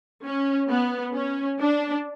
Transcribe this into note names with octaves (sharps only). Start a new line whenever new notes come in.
C#4
B3
C#4
D4